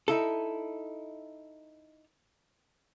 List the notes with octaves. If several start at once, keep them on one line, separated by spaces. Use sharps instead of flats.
D#4 E4 A4